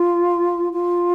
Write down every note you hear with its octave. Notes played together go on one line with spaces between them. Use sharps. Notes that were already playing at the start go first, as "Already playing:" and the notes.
Already playing: F4
F4